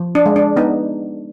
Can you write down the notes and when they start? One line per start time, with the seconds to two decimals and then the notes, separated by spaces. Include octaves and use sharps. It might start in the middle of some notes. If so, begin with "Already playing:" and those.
Already playing: F3
0.15 D4
0.26 G#3
0.36 D4
0.56 B3 D#4